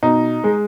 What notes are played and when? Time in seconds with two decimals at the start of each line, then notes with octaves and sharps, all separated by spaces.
0.03 B2 D#4
0.44 G#3